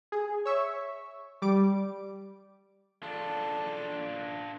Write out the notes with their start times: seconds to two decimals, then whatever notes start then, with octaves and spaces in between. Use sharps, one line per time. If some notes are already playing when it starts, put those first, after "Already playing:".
0.12 G#4
0.45 C#5 E5 C#6
1.42 G3 D6 D7
3.03 D4 F4 A4